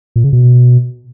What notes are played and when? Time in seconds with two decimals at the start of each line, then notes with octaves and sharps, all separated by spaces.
0.16 A#2
0.24 C#3
0.33 B2